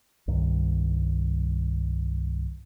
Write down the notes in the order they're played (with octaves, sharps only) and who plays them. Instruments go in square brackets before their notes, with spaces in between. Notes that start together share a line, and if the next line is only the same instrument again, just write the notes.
[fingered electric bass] C2 G2 D#3